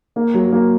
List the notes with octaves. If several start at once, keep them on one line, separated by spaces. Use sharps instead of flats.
A#3
F#3
A#3